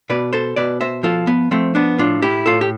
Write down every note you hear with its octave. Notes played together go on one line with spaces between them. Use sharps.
B2 B4 D5
A4 C5
B2 B4 D5
C5 E5
F3 F4 A4
B3
F3 A3 C4
B3 D4
A2 D4 F4
E4 G4
A2 F4 A4
G4